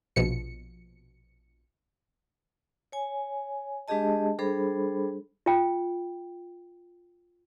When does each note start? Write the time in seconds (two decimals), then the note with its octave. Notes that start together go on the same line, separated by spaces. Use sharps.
0.16 A#1 B2 F3 C#7
2.92 C#5 G#5
3.88 G#3 D4 G4 G#4 D#5 A5
4.39 G3 D4 G#4 A4 C5 B5
5.46 F4 G5